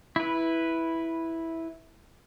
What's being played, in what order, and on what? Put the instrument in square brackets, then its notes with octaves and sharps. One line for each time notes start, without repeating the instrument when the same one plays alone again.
[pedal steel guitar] E4 B4